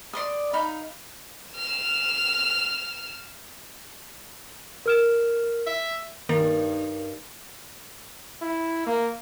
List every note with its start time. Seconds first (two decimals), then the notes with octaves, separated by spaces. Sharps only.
0.13 D5 C6 D#6
0.53 D#4 F5 B5
1.53 F6 E7
4.86 A#4 F6 E7
5.67 E5
6.29 G2 D#3 A#3 D#4 A#4 A6
8.41 E4
8.87 A#3